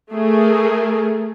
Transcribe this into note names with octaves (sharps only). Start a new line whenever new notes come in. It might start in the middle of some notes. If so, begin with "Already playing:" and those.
A3 G#4 A#4